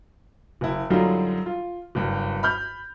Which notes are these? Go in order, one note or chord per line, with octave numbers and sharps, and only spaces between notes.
F#1 E4
F#2 D3 F#3 G3 D#4 F4
F4
F#1 G2
B5 F6 G6